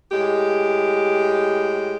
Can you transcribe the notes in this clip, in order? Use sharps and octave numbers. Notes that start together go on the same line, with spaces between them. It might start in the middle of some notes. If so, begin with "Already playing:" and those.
A2 G#3 G4